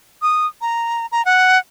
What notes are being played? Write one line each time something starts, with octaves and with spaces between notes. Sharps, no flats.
D#6
A#5
A#5
F#5